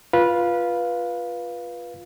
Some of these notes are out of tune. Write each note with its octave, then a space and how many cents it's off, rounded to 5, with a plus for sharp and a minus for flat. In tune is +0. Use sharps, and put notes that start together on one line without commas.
F4 +0 B4 -15 F5 +0